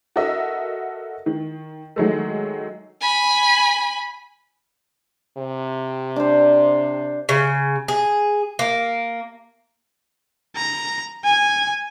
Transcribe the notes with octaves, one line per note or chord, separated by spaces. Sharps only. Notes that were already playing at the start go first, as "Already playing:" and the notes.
F#4 A4 A#4 D#5 E5
D#3
D#3 F#3 G#3 A3
G#5 B5
C3
D4 C5
C#3
G#4
A#3
A#5
G#5